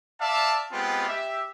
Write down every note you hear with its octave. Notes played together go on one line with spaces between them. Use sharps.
D5 E5 F5 A5
G#3 B3 C4 F4 G4
G4 E5